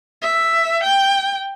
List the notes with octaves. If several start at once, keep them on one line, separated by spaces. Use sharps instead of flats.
E5
G5